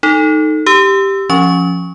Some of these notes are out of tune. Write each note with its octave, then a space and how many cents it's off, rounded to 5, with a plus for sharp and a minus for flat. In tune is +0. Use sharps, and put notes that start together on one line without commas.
D#4 +0 A4 +0
G4 +0 E6 +0
F3 +0 C#4 +0 C#6 +0